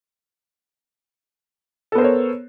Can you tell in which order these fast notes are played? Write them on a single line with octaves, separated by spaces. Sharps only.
A4 B3 C5 A#4 C#5